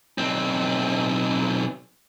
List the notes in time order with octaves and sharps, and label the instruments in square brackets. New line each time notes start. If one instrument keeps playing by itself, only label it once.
[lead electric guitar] B1 C4